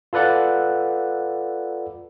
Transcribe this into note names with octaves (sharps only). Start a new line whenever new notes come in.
F4 A4 B4 D5 F#5